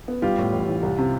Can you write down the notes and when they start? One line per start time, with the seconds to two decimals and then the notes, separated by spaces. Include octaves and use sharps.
0.08 B3
0.22 G3 F4 G4
0.38 A2
0.53 A1
0.68 E3
0.83 C2
0.98 C3